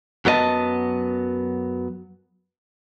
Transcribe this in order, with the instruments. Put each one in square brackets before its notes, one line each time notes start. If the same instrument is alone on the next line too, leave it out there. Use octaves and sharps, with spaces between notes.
[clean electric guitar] F#2 F#3 B3 F4 D#5 A5